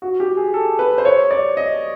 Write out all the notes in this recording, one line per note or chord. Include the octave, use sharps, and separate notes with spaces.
F#4
G4
G#4
A4
B4
C5
C#5
D5
D#5